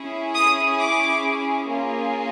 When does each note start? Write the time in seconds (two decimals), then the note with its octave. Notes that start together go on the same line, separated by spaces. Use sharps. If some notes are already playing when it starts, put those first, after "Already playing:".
Already playing: C#4 E4 G#4
0.35 D#6
0.80 D6
1.68 A#3 C#4 F4 G#4